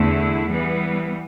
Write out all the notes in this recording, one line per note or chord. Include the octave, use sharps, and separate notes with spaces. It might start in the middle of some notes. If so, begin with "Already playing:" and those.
Already playing: E2 D3 A3 E4
E3 G3 B3